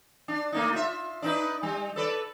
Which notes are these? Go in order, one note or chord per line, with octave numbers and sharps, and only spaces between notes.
D4
A3 A#3 D#4
F4 E5
D4 D#4 B4
G3
A4 B4 D5